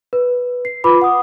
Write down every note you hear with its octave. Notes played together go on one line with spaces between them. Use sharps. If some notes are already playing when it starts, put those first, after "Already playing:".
B4
C7
F4 B4 B5 D6
F#5 D#6